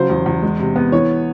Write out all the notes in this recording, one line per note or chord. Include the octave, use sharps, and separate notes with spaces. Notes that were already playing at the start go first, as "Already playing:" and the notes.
Already playing: C#3 F#3 C5
E2
E2
G#3
C3
B3
E3 C#5